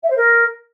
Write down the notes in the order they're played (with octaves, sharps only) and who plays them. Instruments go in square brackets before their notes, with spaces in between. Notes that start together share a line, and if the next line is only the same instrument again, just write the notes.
[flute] E5
C5
A#4